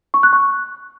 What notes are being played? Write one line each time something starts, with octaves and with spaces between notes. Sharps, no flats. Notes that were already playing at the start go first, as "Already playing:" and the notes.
C#6
F#6
C#6